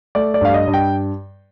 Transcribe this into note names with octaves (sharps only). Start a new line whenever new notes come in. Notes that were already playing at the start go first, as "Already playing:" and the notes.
A3 D5
D5
G2 F5
D#5
G2
G5